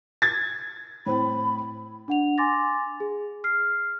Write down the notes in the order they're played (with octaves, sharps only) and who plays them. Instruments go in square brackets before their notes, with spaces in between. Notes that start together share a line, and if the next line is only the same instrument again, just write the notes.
[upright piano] G#6 A6
[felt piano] A2 C4 C5 [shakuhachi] B5
[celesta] D4 F#5 F7
G#5 C6 D6 A6 A#6
G#4
F6 C7